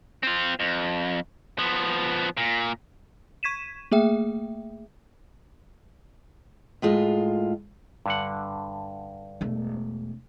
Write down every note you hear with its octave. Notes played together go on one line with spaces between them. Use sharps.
C4 F4
F2
F3 B3
A#2
C#6 G#6 B6 D#7 E7
A3 A#3 G#4 E5 G5
A2 G#3 F4
G2 D3 F#5
E1 A3